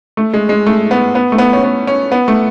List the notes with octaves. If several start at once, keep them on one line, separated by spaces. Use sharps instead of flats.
A3
G#3
G#3
A3
B3
B3
A3
B3
C#4
B3
C#4
B3
A3